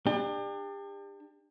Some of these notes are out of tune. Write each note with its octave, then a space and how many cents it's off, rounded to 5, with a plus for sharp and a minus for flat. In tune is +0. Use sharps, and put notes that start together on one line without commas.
D4 +30 G4 +35